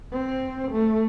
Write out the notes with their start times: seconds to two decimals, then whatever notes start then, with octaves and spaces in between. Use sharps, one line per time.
0.13 C4
0.72 A3